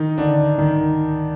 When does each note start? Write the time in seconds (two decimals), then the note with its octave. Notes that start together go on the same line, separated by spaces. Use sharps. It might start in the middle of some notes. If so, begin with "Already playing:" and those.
Already playing: D#3 D#4
0.18 D3 D4
0.58 D#3 D#4